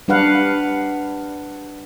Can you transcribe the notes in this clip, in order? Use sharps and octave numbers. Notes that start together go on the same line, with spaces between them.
G3 D4 B4 F5 F#5